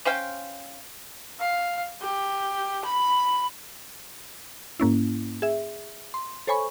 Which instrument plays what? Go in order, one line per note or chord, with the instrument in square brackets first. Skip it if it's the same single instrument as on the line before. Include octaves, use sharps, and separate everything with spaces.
[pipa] C#4 C5 F5 G5
[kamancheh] F5
G4
B5
[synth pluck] G#2 A#3 C#4 E4
G#4 E5
C6
A4 C5 C#5 G#5 B5 C#6